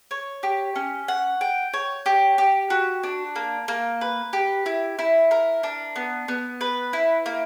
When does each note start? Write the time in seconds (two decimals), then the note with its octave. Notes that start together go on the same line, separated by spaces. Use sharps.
0.11 C#5
0.43 G4
0.76 C#4
1.08 F#5
1.41 G5
1.73 C#5
2.06 G4
2.38 G4
2.70 F#4
3.03 D4
3.36 A#3
3.68 A#3
4.01 B4
4.33 G4
4.66 E4
4.99 E4
5.31 A#4
5.63 D4
5.96 B3
6.28 B3
6.61 B4
6.93 E4
7.26 A#3